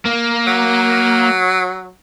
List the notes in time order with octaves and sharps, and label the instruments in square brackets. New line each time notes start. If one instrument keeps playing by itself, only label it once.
[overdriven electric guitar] A#3
[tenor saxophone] F#3